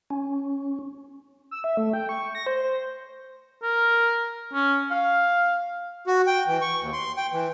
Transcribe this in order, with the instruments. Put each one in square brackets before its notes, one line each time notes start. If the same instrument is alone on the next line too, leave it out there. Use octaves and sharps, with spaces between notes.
[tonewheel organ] C#4
[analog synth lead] E6
E5
A3
G5
C#6
A#6
C5
C5
[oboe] A#4
C#4
F5
[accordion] F#4
G5
E3
C#6
D#2
C6
G5
E3